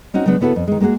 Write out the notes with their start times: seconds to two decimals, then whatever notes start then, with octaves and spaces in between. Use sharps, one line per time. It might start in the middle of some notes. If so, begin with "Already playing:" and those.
0.14 C4 C#4 D#4 F#4
0.26 C#3 F#3 G#3 B3 D4
0.41 C#3 B3 E4 F#4 A4
0.56 F2
0.68 D#3 G#3
0.80 G#3 A#3 F4 F#4 G#4